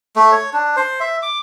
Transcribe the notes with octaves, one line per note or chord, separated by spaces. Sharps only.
A3
C#5
D4
C5
E5
D6